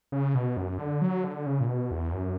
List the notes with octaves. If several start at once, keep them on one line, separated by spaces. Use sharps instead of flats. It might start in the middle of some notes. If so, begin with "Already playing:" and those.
C#3
B2
F#2
D3
F#3
D3
C#3
A#2
B2
E2
F#2